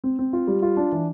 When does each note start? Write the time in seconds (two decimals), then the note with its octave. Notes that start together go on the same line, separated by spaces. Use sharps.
0.04 C4
0.19 C4
0.33 F4
0.47 G3
0.62 F4
0.77 D4
0.92 E3